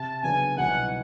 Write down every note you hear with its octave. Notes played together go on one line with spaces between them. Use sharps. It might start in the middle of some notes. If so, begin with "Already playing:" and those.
Already playing: C3 A5
C#3 F#3 B3 D4 G#5
C2 B2 F#3 B3 D#4 F#5